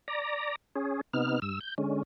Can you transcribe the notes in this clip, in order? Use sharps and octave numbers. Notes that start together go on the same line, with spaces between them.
D5 A#5
C#4 G#4
C3 B3 D#4 F6
G2 E6
G6
D3 G#3 C#4